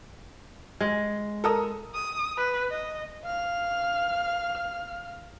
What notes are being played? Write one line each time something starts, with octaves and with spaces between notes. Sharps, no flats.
G#3
A4 A#4 D#6
D#6
B4
D#5
F5 F6